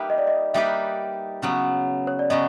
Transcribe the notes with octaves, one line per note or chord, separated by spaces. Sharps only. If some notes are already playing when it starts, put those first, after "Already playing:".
Already playing: G3 A#3 D#4 G4 B4 E5
D#5
D5
D#5
G3 A#3 D#4 G4 B4 E5
C#3 F#3 B3
C#5
D5
C#3 F#3 B3 D#5